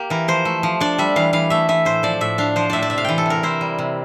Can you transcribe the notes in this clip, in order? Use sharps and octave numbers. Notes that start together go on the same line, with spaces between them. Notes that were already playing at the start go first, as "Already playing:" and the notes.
Already playing: A#3 G4
E3 A#4
F3 C5
A3
F3
D4 D5
G3 E5
E3 F5
E3 F5
A3 E5
E3 E5
A2 C5
F3 D5
A2 E5
D4 F5
F3 C5
A2 D5 E5
D5
C3 E5
F5
E3 G5
A4
C3 A#4
E4 C5
G3
C3